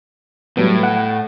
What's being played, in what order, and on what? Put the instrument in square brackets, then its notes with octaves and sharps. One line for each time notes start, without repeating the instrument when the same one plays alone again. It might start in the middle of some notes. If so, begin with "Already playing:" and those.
[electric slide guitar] A2 [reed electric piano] F#3 G3 B3
[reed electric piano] F#5